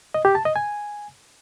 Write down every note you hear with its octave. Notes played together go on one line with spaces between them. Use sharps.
D#5
G4
A5
D#5
G#5